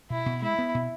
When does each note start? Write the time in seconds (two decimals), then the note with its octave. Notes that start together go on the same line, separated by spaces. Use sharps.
0.10 B2 E4
0.26 B2
0.42 G#3 E4
0.59 B3
0.75 B2